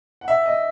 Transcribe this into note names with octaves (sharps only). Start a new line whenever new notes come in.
F#5
E5
D#5